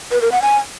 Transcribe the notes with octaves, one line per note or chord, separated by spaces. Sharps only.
B4
A#4
F#5
G#5